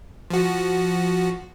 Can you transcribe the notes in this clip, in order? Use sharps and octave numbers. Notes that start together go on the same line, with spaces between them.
F3 F#4